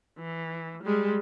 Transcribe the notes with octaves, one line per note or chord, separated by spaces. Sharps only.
E3
G3 G#3